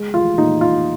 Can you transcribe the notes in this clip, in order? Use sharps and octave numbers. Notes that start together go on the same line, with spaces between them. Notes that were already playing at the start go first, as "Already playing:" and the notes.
Already playing: G#3
F4
A#2 D#4
F4